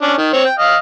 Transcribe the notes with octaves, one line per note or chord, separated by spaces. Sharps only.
C#4 D4
D#3
C4 C#5
G5
D#5 F5